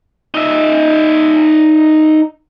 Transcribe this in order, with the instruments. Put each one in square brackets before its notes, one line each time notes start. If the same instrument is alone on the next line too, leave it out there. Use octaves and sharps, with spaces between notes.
[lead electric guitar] D#4 E5